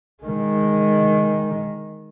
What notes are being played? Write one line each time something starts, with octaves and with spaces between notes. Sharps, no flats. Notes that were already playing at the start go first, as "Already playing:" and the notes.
D#3 G#3